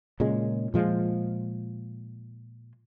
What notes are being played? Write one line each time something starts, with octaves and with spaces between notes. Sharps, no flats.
A#2 C#3 G#3
A#2 F3 G#3